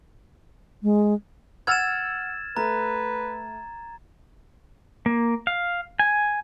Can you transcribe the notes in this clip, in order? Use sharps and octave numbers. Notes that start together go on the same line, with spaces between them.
G#3
F#5 E6 F6 G#6 A6 E7
A3 B4 A#5
A#3
F5
G#5